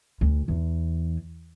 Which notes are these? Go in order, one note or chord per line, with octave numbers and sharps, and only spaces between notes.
D2
E2